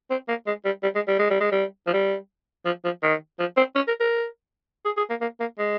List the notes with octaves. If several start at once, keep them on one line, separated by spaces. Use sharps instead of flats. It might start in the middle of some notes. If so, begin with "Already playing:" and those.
C4
A#3
G#3
G3
G3
G#3
G3
G#3
G3
G#3
G3
F3
G3
F3
F3
D#3
F3
C4
C#4
A#4
A#4
G#4
G#4
A#3
A#3
A#3
G#3